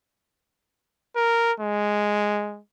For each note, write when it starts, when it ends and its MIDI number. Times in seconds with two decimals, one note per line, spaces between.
1.16 1.52 70
1.60 2.60 56